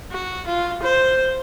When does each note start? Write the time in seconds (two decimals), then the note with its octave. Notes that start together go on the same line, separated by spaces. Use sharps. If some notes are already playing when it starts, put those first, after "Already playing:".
0.12 F#4
0.47 F4
0.83 C5